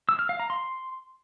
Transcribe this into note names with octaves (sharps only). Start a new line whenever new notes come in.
E6
F6
F5
A#5
C6